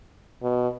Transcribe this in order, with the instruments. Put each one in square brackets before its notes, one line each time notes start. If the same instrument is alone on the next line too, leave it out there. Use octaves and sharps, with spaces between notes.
[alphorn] B2